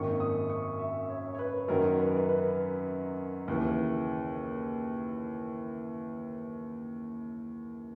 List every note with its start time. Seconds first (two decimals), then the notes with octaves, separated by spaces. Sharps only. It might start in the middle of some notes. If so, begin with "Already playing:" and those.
Already playing: G#1 F#2 D#3 A#3 C#4 C#6
0.20 D#6
0.50 C#6
0.79 E5
1.09 C#5
1.34 C#5
1.39 B4
1.68 F#2 D#3 F#3 A#4
1.99 B4
2.07 A#4
2.16 B4
2.29 B4
3.48 D#2 C#3 E3